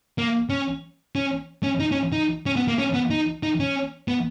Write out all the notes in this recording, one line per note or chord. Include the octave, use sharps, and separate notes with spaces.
A#3
C#4
C#4
C#4
D#4
C#4
D#4
C#4
B3
A#3
C#4
B3
D#4
D#4
C#4
B3